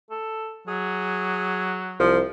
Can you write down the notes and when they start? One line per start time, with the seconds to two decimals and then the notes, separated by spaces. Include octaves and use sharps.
0.11 A4
0.68 F#3 G#4
1.99 C2 F3